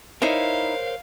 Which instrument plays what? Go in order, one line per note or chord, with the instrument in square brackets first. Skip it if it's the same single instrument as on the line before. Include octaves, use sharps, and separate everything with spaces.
[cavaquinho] D#4 E4 [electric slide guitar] A#4 C5 C#5 [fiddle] F5